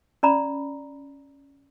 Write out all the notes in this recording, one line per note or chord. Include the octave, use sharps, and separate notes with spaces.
C#4 D5 A#5 B5